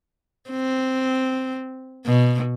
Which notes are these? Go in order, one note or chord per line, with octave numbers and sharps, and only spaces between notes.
C4
B2